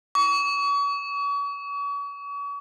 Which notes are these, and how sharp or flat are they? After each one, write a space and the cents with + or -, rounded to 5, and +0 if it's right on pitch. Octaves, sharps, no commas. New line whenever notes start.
C#6 +40